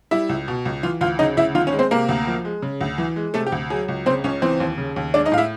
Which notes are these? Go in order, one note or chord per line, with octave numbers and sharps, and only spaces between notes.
G3 E4 E5
C#2
B2
C#2
E3 F4 F5
D2 F4 F5
C#3 D#4 D#5
D2 E4 E5
D#3 F4 F5
C#4 C#5
G#3
C4 C5
C3 A#3 A#4
D2
F3
G#3
C#3
D2
E3
G#3
C3 A3 A4
G4
D2
F#3 G#4
C#2
C#3 C4 C5
C#2 C#4 C#5
E3 C4 C5
D#2
C#3
D#2
G#3 D4 D5
D#4 D#5
A2 F5
E4 E5